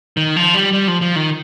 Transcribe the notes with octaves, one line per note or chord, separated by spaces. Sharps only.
D#3
F3
G3
G3
F3
F3
D#3